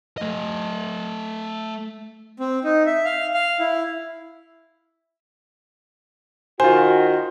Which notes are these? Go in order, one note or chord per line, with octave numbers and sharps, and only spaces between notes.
A3 D#5
C4
D#4
E5
F5
F5
E4
D#3 F4 F#4 C5 G#5